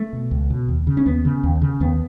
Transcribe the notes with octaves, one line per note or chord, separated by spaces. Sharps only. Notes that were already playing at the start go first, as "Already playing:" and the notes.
Already playing: A3
B2
C#2
B2
D#2
C#3
C#4
D#2 B3
C#3
D#2
C#3
D#2 B3